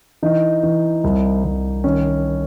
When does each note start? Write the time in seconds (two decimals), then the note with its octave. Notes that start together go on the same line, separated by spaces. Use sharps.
0.23 E3 D#4
0.63 E3
1.04 C2
1.44 C2
1.84 D#3 C#4